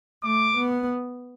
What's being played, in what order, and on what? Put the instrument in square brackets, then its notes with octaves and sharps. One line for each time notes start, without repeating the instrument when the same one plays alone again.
[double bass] A3 [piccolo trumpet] D6
[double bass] B3